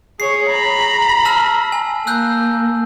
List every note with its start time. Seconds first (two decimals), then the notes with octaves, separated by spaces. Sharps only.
0.20 G#4 C#5 C7
0.50 A#5 B5
1.25 A5 E6 F6
1.72 G#5
2.07 A#3 E6 F#6 G6